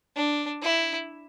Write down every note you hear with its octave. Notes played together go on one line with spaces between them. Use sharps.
D4
E4